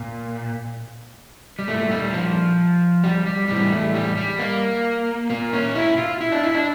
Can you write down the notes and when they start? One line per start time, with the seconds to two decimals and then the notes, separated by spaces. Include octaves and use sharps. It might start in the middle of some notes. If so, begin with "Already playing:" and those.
Already playing: A#2
1.59 G3
1.68 A#2 A3
1.91 G3
2.13 F3
3.04 G3
3.26 G3
3.48 A2 E3 G3
3.71 A3
3.94 G3
4.17 G3
4.39 A#3
5.30 A#2 A#3
5.53 C#4
5.75 E4
5.98 F4
6.21 E4
6.32 D4
6.43 E4
6.54 D4